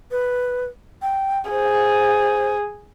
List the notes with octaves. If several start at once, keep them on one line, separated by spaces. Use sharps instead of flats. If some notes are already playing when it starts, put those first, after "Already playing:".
B4
G5
G#4 C5